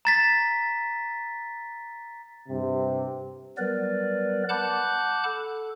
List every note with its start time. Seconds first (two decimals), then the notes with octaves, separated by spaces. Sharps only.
0.05 A#5 A6 B6
2.49 G2 C3
3.58 F#3 G3 B3 A#4 B4 D5
4.49 F#5 A5 B5 D6 F#6 G6
5.24 A4